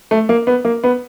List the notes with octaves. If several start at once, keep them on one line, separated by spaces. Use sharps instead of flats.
A3
A#3
B3
A#3
B3